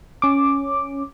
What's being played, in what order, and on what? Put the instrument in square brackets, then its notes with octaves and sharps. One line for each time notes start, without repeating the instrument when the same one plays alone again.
[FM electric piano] C#4 D6